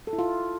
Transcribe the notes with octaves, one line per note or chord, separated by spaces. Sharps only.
A4
E4
F4